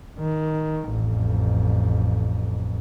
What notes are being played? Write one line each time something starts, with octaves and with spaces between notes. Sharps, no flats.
D#3
A1 F2